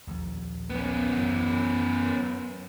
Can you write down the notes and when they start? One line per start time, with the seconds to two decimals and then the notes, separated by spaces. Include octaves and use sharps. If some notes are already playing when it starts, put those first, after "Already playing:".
0.07 A#1 D#2
0.70 B3 C#4
1.16 F#2 E3